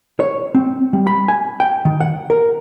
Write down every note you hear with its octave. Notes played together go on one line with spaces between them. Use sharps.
C#5
C4
G3
B5
G#5
G5
D#3
F#5
A#4